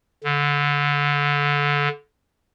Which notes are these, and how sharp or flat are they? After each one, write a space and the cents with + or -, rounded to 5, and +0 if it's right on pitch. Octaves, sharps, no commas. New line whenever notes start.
D3 -20